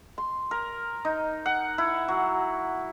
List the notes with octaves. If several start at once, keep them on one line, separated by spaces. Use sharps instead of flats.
C6
A#4
D#4
F#5
E4
F#3